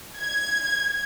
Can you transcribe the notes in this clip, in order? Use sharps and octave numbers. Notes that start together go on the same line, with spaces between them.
G#6